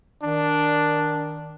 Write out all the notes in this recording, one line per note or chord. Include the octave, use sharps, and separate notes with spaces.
D#3 D4